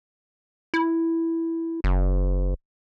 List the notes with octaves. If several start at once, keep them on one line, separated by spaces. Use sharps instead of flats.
E4
F#1